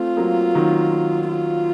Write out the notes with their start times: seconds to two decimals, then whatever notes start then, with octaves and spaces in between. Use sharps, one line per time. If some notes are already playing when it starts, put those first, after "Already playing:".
Already playing: A3 C4 F4
0.17 F#3 A#3
0.55 D#3 F#3
1.28 F4